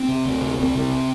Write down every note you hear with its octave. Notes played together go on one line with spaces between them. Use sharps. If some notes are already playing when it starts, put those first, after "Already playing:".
Already playing: C4
C3
D2
C3
C2 C4
C3